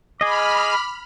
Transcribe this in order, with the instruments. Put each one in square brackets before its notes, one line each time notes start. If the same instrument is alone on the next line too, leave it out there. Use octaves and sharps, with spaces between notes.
[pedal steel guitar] G#4 D#5 [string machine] B5 F6 [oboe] D6